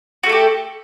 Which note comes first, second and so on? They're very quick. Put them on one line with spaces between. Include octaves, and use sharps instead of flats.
F#4 A3 A4 G4